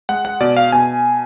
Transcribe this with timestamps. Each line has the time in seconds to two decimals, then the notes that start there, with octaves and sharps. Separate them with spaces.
0.09 G#3 F#5
0.25 F#5
0.40 B2 D5
0.57 F5
0.72 B2 G#5